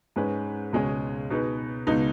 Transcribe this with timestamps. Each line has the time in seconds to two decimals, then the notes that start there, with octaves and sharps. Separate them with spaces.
0.16 G#2 G#3 C#4 B4
0.73 C#2 B2 G#3 C#4 G#4
1.30 B2 B3 D#4 G#4 B4
1.87 C#2 B2 B3 D#4